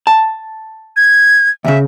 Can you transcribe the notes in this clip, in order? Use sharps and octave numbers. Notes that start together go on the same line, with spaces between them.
A5
G#6
D2 C#3 E5